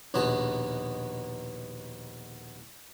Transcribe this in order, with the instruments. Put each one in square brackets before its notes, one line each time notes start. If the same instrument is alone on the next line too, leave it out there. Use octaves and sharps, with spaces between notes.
[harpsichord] A#1 D#2 B2 B3 A5